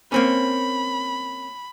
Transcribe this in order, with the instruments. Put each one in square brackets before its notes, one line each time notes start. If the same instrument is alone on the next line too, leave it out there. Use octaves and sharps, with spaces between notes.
[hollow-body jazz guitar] A#3 C4 C#4 [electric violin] B5